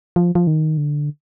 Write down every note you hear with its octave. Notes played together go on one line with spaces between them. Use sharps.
F3
F3
D#3
D3